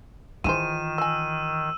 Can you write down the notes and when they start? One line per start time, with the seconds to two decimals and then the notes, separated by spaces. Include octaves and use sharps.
0.44 D#3 E3 E4 F4 G#4 C5 D#7 E7
0.98 D#5 G#5 E6